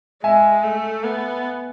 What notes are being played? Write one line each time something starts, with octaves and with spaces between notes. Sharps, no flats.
G#3 E5 G#5
A3
B3